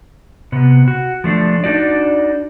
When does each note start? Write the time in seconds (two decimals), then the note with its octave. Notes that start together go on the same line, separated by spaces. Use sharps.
0.52 C3 B3
0.88 F#4
1.24 F3 A3 D4
1.64 D4 D#4 F#4 D5